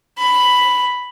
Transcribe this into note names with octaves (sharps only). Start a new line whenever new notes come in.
B5